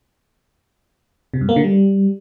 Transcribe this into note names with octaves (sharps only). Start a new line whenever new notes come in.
C3
G2
A#3
D3
G3